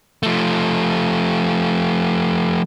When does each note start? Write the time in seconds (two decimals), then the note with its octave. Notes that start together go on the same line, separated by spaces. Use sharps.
0.23 F3 A3